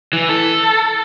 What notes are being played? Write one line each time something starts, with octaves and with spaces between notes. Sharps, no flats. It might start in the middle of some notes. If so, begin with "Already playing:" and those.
E3
A4